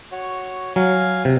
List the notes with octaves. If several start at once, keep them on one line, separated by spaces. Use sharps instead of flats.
F#4 C#5
F#3 F5 G#5
C3